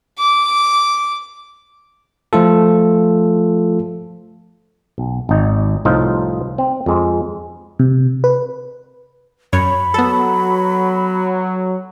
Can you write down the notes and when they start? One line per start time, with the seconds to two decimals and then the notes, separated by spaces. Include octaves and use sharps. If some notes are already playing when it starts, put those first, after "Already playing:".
0.19 D6
2.33 F3 A3 F4 A4
4.98 B1
5.29 G#1 D#4
5.85 C2 A2 F3 D#4 F4
6.58 C4
6.86 F2 G#3
7.79 C3
8.24 B4
9.53 F#2 C#5 B5
9.94 F#3 B3 A4